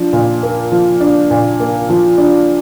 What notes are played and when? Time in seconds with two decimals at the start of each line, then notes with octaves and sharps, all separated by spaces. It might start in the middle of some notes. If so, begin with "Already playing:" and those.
Already playing: F3 D4
0.13 A#2
0.43 A#3
0.72 F3
1.01 D4
1.31 A#2
1.60 A#3
1.89 F3
2.18 D4